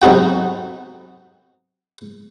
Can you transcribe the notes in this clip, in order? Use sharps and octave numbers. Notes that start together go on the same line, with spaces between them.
B1 C3 D#4 F#4 G5